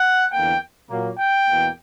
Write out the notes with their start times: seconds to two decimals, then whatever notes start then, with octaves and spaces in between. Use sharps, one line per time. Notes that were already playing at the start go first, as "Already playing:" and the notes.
Already playing: F#5
0.32 E2 D3 A#3 G5
0.90 A#2 F#3 A#3
1.18 G5
1.47 E2 B2 A#3